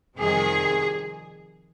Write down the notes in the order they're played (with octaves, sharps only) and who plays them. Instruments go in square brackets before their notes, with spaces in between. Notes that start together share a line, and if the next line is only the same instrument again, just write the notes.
[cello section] F2 C3 D#3 G3 G#4